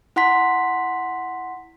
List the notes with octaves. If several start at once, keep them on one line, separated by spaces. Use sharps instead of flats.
E4 F#5 C6 B6